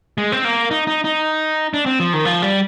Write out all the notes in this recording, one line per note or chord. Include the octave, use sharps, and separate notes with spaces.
G#3
C4
A#3
D#4
D#4
D#4
D4
C4
F3
D#3
F3
G3